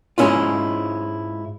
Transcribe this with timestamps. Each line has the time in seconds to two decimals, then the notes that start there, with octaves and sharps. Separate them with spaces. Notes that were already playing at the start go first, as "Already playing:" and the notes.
0.18 G#2 G#3 A3 C#4 E4 F4